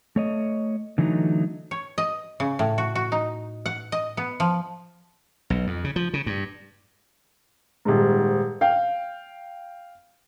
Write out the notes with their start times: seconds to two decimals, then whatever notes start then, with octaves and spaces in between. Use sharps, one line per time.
0.16 A3 C#5 D#5
0.98 D3 E3 F#3 A3 D#4
1.71 C#5
1.98 D#5
2.40 C#3
2.59 A2
2.78 F#4
2.95 F#4
3.12 D#4
3.66 F#5
3.92 D#5
4.17 B3
4.40 F3
5.50 B1
5.67 F2
5.84 C#3
5.96 F3
6.14 C#3
6.26 G2
7.85 D#1 G#2
8.61 F5 G5